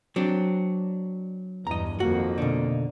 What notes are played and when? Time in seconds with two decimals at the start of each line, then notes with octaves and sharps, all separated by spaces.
0.16 F#3 C4 D4
1.67 E2 G2 D#5 A#5
2.00 F2 D#3 A#3 F#4
2.38 B2 D3